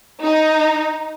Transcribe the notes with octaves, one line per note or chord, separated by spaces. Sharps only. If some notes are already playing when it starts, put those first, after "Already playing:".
D#4